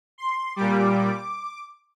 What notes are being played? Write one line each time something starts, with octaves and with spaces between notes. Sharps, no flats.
C6
A#2 G3 D6